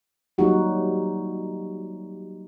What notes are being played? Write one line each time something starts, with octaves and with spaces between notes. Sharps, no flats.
F#3 G3 A#3 D#4 F#4 G4